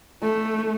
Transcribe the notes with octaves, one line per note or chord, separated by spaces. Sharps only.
A3